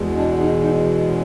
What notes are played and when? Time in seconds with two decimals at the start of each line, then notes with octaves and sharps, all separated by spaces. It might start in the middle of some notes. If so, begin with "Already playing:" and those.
Already playing: E2 B2 G#3
0.17 D4
0.40 D#4
0.62 D#4
1.07 C#4